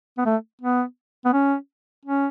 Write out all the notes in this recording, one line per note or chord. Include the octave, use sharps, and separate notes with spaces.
B3
A3
B3
B3
C#4
C#4